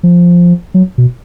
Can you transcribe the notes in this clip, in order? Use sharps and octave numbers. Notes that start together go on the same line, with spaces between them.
F3
F#3
B2